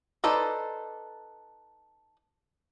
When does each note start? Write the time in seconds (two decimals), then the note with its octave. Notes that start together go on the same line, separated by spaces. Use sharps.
0.24 D#4 A4 B4 C5 D5